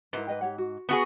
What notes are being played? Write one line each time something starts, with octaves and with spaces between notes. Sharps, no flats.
G#2 E4 A#4 B4
B4 D#5 G5
G4 C#5 F#5
F#4
B3 F#4 G#4